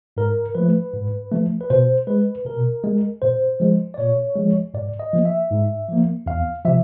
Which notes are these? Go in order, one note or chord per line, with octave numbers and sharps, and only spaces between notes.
G#2 A#4
F3 A3 B4
G#2
F3 A3
B4
B2 C5
G#3 B4
B2 A#4
G#3
A#2 C5
F3 G#3
D5
A#2 C#5
F3 G#3
G#2 D5
D#5
F3 A#3
E5
G#2
F3 A#3
E2 F5
C3 F3 E5